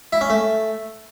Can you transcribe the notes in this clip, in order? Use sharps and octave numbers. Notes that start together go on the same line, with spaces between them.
E4
C#4
A3